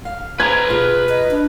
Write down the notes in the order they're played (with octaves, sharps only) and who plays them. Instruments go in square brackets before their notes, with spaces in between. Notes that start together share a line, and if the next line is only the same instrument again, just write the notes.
[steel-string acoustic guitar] F5
[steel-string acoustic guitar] G#4 C5 [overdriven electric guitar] B4 A#5 [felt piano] G#6
[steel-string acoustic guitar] B2 F4 [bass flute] G#4
[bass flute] D#5
D4